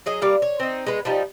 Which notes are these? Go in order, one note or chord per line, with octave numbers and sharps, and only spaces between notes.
F#3 G#4 D#5
G3 A#3 F5
C#5
C4 D#4
G#3 B3
F3 G3 D#4